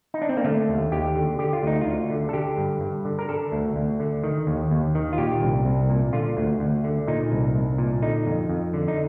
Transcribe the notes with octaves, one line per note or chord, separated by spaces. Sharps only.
D#4
D4
C4
A#3
D3 A3
D#2
D#2 G4
D3
D3 G4
F4
D2 D#4
F4
D2
D3
A4
D3 G4
G2
G2
D3
A#4
D3 A4
D2
D2
D3
D#3
D#2
D#2
D#3
F4
A#2 G4
C2
C2
A#2
D3 F4
D2
D2
D3
A#2 D#4
C2
C2
A#2
D3 D#4
F2
F2
D3
D#4